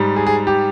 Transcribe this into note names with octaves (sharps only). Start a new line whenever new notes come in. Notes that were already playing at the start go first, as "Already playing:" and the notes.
Already playing: G#2 G3
G#4
G#4
G4